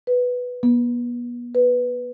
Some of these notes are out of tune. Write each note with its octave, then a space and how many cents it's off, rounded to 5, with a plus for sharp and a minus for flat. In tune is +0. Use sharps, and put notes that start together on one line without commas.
B4 +0
B3 -40
B4 +0